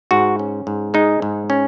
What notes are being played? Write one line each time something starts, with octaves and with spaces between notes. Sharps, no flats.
G#2 F#4
C#4
G#2
G#3 D#4
G#2
C#4